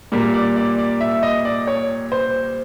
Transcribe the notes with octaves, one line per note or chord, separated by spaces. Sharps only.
A#2 G3 A#3
D5
D5
D5
E5
D#5
D5
C#5
C5